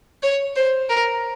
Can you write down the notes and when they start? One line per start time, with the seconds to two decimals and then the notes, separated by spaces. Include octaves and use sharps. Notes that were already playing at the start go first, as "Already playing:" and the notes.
0.23 C#5
0.56 C5
0.89 A#4